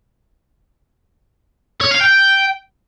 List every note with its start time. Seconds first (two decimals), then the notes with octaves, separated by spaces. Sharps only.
1.81 C#5
1.91 F5
2.01 G5